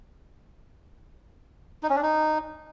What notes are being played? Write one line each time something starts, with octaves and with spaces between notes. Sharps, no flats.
D#4
C#4
D4
D#4